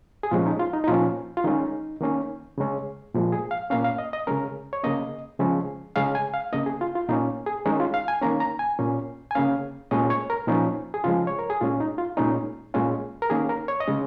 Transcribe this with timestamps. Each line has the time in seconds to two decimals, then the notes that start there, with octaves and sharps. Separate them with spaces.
0.23 G#4
0.31 A#2 F3 G#3 C#4 F4
0.46 D#4
0.59 F4
0.73 D#4
0.84 D#4
0.88 A#2 F3 C#4 F4
1.37 F4
1.44 D#3 G#3 C#4 D#4
2.01 D#3 A#3 C#4
2.58 C#3 G#3 C#4
3.14 A#2 F3 G#3
3.32 G#4
3.51 F5
3.70 A#2 A#3 C#4 F5
3.84 F5
3.98 D#5
4.13 D#5
4.27 C#3 G#3 C#4 A#4
4.73 C#5
4.83 C#3 A#3 C#4 D#5
5.39 C#3 F3 G#3 C#4
5.96 C#3 G#3 C#4 F5
6.15 G#5
6.34 F5
6.53 C#3 A#3 C#4 D#5
6.66 G#4
6.81 F4
6.95 F4
7.09 A#2 A#3 C#4 D#4
7.46 G#4
7.66 D#3 G#3 C#4 D#4
7.80 F4
7.94 F5
8.08 G#5
8.21 D#3 A#3 C#4 A#5
8.40 A#5
8.59 G#5
8.79 A#2 A#3 C#4
9.31 G#5
9.35 C#3 A#3 C#4 F5
9.91 A#2 G#3 C#4 D#5
10.10 C#5
10.30 A#4
10.47 A#2 F3 C#4 D#4
10.94 G#4
11.04 C#3 F3 G#3 F4
11.27 C#5
11.39 A#4
11.50 G#4
11.61 A#2 G#3 C#4 F4
11.80 D#4
11.98 F4
12.17 A#2 G#3 C#4 D#4
12.74 A#2 G#3 C#4 F4
13.22 A#4
13.30 D#3 A#3 C#4 G#4
13.49 A#4
13.68 C#5
13.80 D#5
13.87 C#3 G#3 C#4